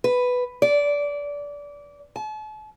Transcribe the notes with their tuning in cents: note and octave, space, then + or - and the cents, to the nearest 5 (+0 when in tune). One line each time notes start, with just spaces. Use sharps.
B4 +5
D5 -20
A5 -40